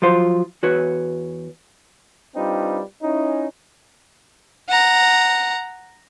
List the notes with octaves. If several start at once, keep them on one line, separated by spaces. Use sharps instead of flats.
F3 F#3 F4 C5
E2 F#4 B4 C#5
G3 C4 D4 D#4 F4 B4
C#4 D#4 E4
F#5 A#5